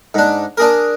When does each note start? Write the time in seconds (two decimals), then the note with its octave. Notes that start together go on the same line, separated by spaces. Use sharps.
0.14 G#2 D4
0.57 D4 G#4 A#4